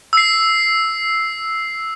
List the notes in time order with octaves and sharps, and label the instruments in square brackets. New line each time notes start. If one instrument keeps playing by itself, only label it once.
[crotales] E6 C7